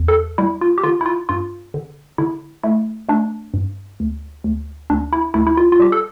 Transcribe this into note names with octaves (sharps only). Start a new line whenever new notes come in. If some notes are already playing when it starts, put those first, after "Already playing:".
Already playing: E2
A4
G3 E4
F4
G4
D3 F4
E4
F4
G2 F4
D3
D3 E4
A3 E4
A3 D4
G2
D2
D2
D2 D4
E4
D2 E4
E4
F4
F4
G3 G4
A4